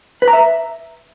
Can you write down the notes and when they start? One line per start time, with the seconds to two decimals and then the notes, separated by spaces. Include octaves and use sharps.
0.22 B4
0.28 A#5
0.33 E5